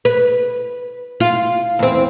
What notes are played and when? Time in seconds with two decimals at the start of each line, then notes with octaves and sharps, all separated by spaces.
0.05 B4
1.20 F4
1.79 E2 C4